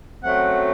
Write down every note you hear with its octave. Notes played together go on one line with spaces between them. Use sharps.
F#2 F#3 A3 C4 F#5